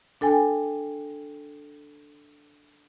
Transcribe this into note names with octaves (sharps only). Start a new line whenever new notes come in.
D4 A4 G5 G#5